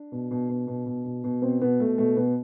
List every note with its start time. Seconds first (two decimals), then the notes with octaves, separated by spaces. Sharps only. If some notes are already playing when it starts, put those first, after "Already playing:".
Already playing: D4
0.12 B2
0.31 B2
0.49 B2
0.67 B2
0.86 B2
1.05 B2
1.24 B2
1.42 B2 C4
1.61 B2 B3
1.80 B2 A3
1.98 B2 A3
2.16 B2 B3